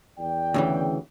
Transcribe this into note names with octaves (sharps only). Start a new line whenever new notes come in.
E2 D5 G5
D2 C#3 E3